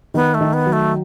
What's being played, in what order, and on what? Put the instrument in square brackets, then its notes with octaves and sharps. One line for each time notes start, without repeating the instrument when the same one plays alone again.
[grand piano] D#3 [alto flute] B3
[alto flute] A3
[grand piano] D#3
[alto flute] B3
[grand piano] F#3
[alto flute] A3